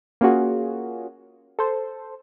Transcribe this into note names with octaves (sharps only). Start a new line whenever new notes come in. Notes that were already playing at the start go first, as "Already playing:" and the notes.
A#3 C#4 F4 F#4 G#4
A4 C5